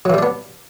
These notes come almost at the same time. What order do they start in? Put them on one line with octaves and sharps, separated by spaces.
F#3 E3 G3 D4 B3